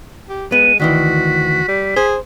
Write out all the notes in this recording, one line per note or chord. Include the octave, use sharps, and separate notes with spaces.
G4
G#3 B3 D#7
D2 D#3 E3 F#4 B6
G3
G#4 C5